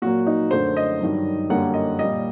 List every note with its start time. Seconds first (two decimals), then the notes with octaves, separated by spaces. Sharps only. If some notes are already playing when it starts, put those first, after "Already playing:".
0.02 A#2 F#3 A#3 F#4
0.27 D#4
0.51 F#2 D3 A3 C5
0.77 D#5
1.01 G2 D#3 F#3
1.50 F#2 D3 G3 A#3 F#5
1.74 D#5
1.99 A#2 G3 A#3 D#5